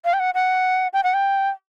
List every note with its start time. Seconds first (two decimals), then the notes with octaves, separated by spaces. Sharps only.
0.05 F5
0.13 G5
0.20 F#5
0.35 F#5
0.93 G5
1.04 F#5
1.14 G5